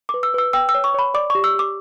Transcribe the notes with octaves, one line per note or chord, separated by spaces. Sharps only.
B4 D6
E6
B4 E6
G5 E6
E6
C#5
C#6
C#5 B5
D5 D6
G4 C#6
E6
G4 D6